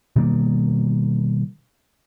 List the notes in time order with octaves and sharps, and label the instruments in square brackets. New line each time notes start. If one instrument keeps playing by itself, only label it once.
[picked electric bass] B2 D#3 G3 A#3